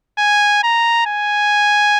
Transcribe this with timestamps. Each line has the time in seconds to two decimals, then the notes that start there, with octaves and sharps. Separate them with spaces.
0.18 G#5
0.63 A#5
1.06 G#5